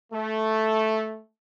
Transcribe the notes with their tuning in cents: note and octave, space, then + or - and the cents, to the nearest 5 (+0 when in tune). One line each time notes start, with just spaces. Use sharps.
A3 -5